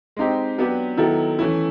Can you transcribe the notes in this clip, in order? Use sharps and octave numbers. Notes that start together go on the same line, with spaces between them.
G#3 C4 D#4 G4
F#3 B3 D4 G4 B4
D#3 F#3 B3 E4 A4
E3 A3 C#4 E4